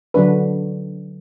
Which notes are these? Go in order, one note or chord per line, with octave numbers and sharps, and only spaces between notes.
D3 F#3 D4 B4